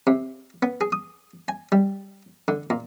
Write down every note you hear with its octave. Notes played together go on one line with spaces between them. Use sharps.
C3
B3
G#4
D#6
G#5
G3
D3
A#2